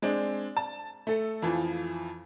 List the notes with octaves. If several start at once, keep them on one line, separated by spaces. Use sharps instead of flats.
G#3 C4 D4
A5
A3 A4
F2 E3 F3